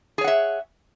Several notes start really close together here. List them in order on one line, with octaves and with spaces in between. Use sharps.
G#4 C#5 F#5 E5